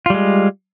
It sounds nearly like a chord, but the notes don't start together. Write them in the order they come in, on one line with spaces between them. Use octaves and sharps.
F4 G3 G#3